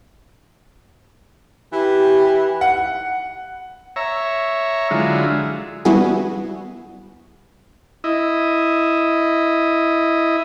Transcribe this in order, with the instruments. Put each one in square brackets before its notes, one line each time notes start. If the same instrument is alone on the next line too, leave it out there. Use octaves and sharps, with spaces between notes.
[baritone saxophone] E3 [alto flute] G4
[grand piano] F#5
[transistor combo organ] C#5 E5 A#5
D3 F#3 G#3 E4 F4
[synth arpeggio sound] G3 B3 E4 F#4 G#4
[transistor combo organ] E4 D#5